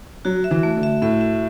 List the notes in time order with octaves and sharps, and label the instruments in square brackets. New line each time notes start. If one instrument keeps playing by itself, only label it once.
[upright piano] F#3 [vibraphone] F#4
[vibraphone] E5
[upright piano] E3
[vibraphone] A3
[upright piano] D3
[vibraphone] E5
[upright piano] A2 [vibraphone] E5
[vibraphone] E5